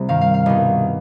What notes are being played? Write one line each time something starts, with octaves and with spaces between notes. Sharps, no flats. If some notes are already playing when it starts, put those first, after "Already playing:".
Already playing: C2 C3
G2 D#3 F5
F5
F5
C2 B2 D#5